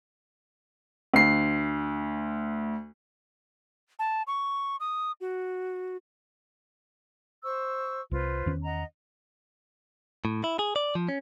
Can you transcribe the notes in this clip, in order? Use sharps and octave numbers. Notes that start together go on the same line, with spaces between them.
D2 C7
A5
C#6
D#6
F#4
C5 C#6 E6
C2 F4 B4 C5
E2 D#3 C#4
D#5 F#5 A#5
A2
E4
G#4
D5
F3
C#4